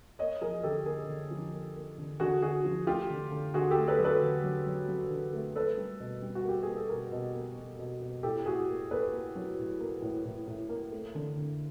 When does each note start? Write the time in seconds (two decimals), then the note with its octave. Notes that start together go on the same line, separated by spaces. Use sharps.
0.19 A#3 C#5 D#5
0.41 F3 G#4 A#4
0.63 D3 G4 A4
0.86 A#3 G#4 A#4
1.09 D3
1.31 F3
1.53 A#3
1.76 A#3
1.98 D3
2.20 D3 F#4 G#4
2.42 D3 F#4 G#4
2.65 F3
2.87 A3 F4 G4
3.10 D3
3.31 D3
3.54 D3 F#4 G#4
3.71 G4 A4
3.76 A3
3.88 A4 B4
3.99 F#3
4.05 A4 B4
4.22 D3
4.44 F#3
4.66 F#3
4.89 F#3
5.10 D3
5.33 A3
5.55 A#3 A4 B4
5.77 G3
6.00 B2
6.22 G3
6.35 F#4
6.45 A#3 G4
6.63 A#3 G#4
6.76 A4
6.89 B2 G#4 A#4
7.12 B2
7.35 A#3
7.57 B2
7.79 B2
8.02 B2
8.23 A2 G4 A4
8.46 A2 F#4 G#4
8.69 A#3
8.91 A#3 A4 B4
9.13 A#3
9.36 F#3
9.58 A2
9.80 A#3
10.02 A2
10.25 A2
10.47 A2
10.69 A#3
10.92 A3
11.15 D3
11.37 D3